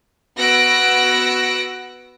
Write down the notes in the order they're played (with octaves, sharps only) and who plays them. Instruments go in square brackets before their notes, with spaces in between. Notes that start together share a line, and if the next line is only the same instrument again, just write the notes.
[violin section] B3 F#4 E6 F#6 A#6 D7